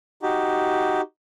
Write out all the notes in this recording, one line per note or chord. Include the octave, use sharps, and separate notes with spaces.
D#4 F#4 G4